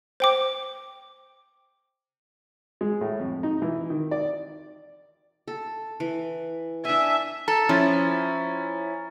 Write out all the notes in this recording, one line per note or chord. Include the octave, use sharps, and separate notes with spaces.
C5 G5 D6
G#3
A2
F2
D#4
E3
D#3
D5
A4
E3
D4 E5 G#5
A4 A#5 A6
F3 C#4 E4
F6